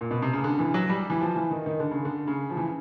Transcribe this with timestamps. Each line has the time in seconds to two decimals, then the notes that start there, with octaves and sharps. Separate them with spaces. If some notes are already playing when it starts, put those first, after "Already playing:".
0.01 A#2
0.11 B2
0.22 C3
0.33 C#3
0.44 D3
0.59 E3
0.74 F#3
0.89 G3
1.10 E3
1.21 F3
1.36 E3
1.51 D#3
1.66 D#3
1.80 D3
1.91 C#3
2.05 D3
2.27 C#3
2.50 F3
2.57 E3